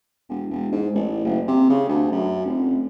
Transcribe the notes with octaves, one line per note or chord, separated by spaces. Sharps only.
E1
E1
G#2
A1
F#1
C3
C#3
D2
F#2
F1